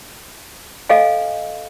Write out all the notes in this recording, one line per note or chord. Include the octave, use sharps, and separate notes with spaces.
A4 D#5 F5 G#5